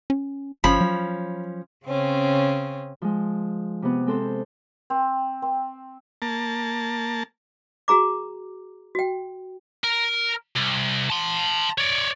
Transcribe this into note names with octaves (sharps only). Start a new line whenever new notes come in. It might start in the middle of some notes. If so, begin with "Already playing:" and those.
C#4
G1 F3 C#4 B5
F#3
C#3 C4 C#4
F3 G#3
C3 B3
G#3 C4 A4 C5
C4
C4
A#3 A5
F#4 G#4 A#5 D6
F#4 G5
A#4
C2
A5 C6
C#5 D5